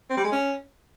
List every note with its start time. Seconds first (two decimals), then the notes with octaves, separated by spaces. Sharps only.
0.10 C4
0.17 G3
0.24 G#3
0.32 C#4